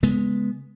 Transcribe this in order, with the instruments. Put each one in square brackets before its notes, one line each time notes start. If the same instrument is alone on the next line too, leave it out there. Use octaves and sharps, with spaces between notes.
[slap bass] C#3 G#3 B3